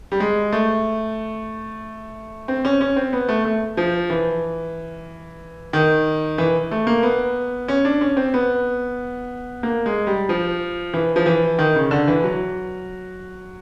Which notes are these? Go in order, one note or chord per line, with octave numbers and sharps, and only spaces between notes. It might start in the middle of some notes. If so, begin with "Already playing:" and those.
G3
G#3
A3
C4
C#4
C#4
C4
B3
A3
A3
F3
E3
D#3
E3
A3
A#3
B3
C#4
D4
C#4
C4
B3
A#3
G#3
G3
F3
E3
F3
E3
D#3
C#3
D3
E3
F#3